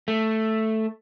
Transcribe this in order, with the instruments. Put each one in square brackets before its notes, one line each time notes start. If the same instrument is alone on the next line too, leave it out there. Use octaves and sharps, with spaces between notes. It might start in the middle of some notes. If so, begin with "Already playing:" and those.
[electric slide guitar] A3